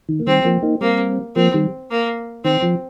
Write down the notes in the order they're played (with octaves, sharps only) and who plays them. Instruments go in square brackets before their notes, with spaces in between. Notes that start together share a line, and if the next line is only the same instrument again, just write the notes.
[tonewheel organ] D#3
A#3
[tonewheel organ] D#3 G3 [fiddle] C4
[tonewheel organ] F3 A#3
A#3 D#4
[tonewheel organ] G3 C4 [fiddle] A#3
[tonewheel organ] F3 A#3 [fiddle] C4
[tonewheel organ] D#3 G3
[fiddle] A#3
[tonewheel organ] D#3 [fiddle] C4
[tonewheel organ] F3